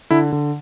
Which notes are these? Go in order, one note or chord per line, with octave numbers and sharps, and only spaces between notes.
D3 E4
D3